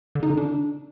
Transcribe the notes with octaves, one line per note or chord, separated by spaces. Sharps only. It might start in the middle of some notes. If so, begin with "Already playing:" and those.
D3
D#4
D3
D4